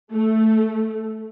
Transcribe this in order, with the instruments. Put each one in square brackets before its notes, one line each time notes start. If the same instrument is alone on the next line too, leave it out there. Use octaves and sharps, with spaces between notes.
[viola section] A3